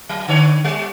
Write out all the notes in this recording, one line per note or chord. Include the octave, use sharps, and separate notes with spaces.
F#3
D3 C#5
G3